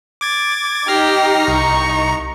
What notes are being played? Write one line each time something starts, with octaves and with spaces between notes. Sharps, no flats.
D6 G#6 A6
D#4 G4 F6 A#6 C7
C2 A#5 C#6